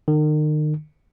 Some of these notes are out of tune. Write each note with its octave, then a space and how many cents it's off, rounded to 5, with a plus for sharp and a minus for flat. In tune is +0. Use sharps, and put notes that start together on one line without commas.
D#3 -40